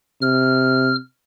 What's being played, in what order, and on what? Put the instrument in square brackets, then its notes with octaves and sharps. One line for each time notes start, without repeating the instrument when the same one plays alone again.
[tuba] C3 [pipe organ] F6